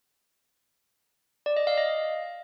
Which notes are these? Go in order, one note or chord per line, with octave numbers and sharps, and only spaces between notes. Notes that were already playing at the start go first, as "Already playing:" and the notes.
D5
D#5
F5
D#5